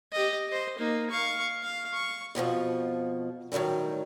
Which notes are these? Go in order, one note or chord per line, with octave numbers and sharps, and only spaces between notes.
G4 D#5
C5 D#5
A#3 D#4
F5 C#6
F5
C#6
F2 B2 D#3 F3
A2 D#3 E3 F#3 G3